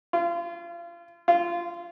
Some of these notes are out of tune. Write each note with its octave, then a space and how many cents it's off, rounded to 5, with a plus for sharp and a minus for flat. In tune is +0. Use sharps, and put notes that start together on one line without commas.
F4 -30
F4 -20